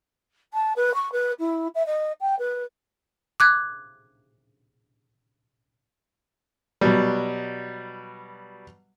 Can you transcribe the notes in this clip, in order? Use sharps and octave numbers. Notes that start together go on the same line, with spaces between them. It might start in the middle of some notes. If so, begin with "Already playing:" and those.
A5
B4
C#6
B4
E4
E5
D#5
G5
B4
D6 F#6 G#6
B2 F#3 G3